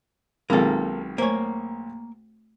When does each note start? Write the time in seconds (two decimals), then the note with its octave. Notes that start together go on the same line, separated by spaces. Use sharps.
0.50 B1 D#3 G#3 A#3 C4 F4 A4
1.18 A3 A#3 C5 C#5